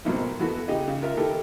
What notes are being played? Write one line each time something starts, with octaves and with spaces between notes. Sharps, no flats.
F2 G#2 B2 F#3 A#3 C4
E2 E3 A3 B3 F#4
C#3 D#4 G4 G#4 D#5
C#3
F4 A#4 E5
D#3 A3 E4 G4 A4 A#4